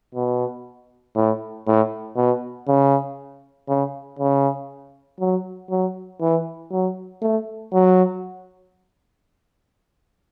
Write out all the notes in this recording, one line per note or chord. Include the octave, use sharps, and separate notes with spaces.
B2
A2
A2
B2
C#3
C#3
C#3
F#3
F#3
E3
F#3
A3
F#3